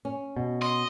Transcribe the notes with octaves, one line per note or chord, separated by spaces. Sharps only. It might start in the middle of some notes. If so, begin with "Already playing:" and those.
C#4
B2
D#5 C6